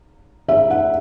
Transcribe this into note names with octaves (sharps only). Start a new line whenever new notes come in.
E5
F#5